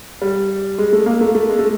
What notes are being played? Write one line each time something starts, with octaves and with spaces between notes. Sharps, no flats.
G3
G#3
A3
A#3
A3
A3
G#3
A3